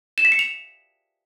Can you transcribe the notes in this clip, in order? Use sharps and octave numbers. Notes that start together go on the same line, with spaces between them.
E7
B6
C#7
F7